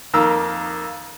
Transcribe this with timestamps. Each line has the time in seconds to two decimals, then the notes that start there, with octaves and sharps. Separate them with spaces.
0.14 F2 D#3 A#3 A#5 E6